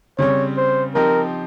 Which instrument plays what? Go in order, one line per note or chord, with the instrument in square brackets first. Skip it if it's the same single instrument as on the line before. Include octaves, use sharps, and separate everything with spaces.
[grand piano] C#3 G3 C4 [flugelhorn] C#5
[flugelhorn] C5
[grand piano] F3 C4 D#4 G4 [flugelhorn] A#4